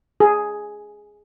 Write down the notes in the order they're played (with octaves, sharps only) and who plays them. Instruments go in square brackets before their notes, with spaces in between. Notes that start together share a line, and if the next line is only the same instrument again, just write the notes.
[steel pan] G#4